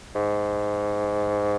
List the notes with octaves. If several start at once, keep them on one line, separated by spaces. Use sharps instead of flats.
G#2